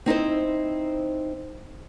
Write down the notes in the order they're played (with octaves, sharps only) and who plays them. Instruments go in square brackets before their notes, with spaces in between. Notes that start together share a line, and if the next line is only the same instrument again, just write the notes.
[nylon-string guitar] C4 D#4 E4 C5